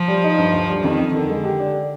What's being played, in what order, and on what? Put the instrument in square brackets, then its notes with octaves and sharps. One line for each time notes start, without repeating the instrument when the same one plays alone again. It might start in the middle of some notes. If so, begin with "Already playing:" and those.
Already playing: [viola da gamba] F3
[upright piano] G3
D#4
G2
D2
G3
[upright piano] F2 [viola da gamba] D#3
[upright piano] F2
[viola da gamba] D3 [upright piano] D#3
[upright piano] G#3
G4
D4